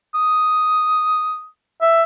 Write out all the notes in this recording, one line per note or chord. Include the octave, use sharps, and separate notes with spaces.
D#6
E5